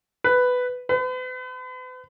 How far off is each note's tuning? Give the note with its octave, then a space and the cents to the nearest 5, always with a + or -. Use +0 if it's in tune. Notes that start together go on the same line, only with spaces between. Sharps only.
B4 +10
B4 +45